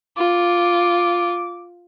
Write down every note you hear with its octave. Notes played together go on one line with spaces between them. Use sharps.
F4 D6